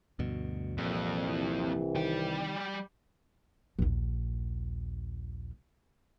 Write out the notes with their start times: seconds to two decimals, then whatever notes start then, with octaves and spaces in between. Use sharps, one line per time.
0.19 D2 G2 B2
0.78 C2 F2 A#2 E3
1.95 D#3 G3 G5
3.79 A#1 D#2